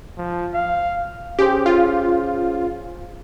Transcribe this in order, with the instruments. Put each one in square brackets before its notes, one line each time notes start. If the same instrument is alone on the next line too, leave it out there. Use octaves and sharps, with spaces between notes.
[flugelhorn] F3
F5
[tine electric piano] C#4 G#4 C5 [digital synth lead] G4
[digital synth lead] F4